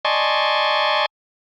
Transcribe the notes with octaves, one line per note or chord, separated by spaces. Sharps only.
D5 D#5 G#5 A5 C6 C#6